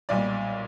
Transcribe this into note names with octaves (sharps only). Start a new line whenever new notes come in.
B1 A#2 G3 D5